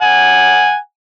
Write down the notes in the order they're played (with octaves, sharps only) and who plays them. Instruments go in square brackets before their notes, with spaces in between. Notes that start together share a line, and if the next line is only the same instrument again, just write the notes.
[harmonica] F#5 G#5